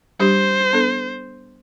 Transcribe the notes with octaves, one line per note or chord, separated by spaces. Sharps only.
G3 D4 G4 C5
B3 D4 A4